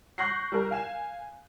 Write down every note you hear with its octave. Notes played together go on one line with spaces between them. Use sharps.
C#6 F#6 G6 A#6 C7
G3 A#4
F5 G#5 E7